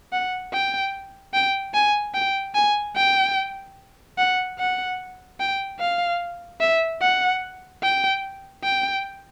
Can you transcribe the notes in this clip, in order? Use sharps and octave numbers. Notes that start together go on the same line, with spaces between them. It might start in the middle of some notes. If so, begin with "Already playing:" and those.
F#5
G5
G5
G#5
G5
G#5
G5
F#5
F#5
G5
F5
E5
F#5
G5
G5